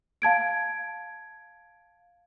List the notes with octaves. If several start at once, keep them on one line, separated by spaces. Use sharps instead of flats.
F5 A5 G#6 D7